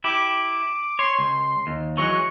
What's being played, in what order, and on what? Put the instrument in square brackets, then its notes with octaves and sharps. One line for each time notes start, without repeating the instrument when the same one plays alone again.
[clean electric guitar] E4 G4 [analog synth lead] D6
[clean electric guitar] C#5 [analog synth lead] C6
[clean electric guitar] C#2
D#2
[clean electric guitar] E3 F#3 G#3 [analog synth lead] C#6